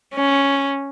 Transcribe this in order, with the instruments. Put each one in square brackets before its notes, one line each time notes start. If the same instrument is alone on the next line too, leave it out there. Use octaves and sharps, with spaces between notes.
[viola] C#4